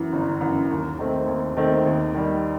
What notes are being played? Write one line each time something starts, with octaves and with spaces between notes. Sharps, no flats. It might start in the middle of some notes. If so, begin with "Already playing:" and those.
Already playing: F#2 E3
G1
F#2 E3
D#2
D#3 A3 C4
D#2
D#3 A3 C4
D#2
D#3 G3